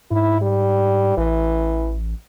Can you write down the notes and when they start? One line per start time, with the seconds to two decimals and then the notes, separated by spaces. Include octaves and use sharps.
0.11 G#2 E4
0.41 G3
1.17 A1 E3